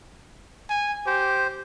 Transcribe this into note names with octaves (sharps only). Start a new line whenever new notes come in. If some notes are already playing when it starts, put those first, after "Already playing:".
G#5
G4 C5